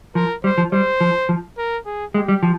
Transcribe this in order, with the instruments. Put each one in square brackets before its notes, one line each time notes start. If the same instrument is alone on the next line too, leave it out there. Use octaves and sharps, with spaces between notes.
[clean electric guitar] F3 [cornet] A#4
[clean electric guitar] G3 [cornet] C5
[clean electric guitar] F3
[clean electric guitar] G3 [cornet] C5
[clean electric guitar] F3
F3
[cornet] A#4
G#4
[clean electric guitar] G#3 [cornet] G4
[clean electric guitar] G3
F3